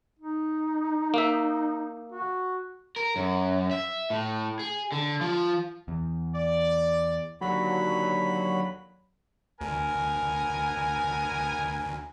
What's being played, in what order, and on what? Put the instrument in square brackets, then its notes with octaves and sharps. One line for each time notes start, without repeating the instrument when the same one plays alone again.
[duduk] D#4
[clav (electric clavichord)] A#3 E5
[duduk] F#4
[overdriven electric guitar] A#4
F#2
E5
A2
G#4
D3
F3
[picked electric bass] E2
[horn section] D5
[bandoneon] D#2 D3 B5 [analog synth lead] F#3
[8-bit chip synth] D2 [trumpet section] B3 A#4 G#5